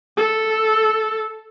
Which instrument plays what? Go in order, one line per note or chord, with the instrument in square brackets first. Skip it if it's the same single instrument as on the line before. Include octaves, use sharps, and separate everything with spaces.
[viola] A4